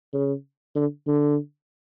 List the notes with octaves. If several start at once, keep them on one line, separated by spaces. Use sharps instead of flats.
C#3
D3
D3